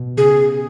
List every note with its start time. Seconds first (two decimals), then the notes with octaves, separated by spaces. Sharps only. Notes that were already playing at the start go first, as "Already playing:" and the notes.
Already playing: B2
0.17 C#3 G#4